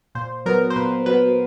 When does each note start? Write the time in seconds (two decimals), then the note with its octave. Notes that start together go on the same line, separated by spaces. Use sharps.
0.15 A#2 C5
0.46 F#3 B3 A#4
0.70 C5
0.76 A#2 B4
1.06 F#3 B3 B4